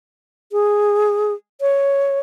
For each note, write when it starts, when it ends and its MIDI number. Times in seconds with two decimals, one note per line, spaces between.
0.52 1.33 68
1.61 2.20 73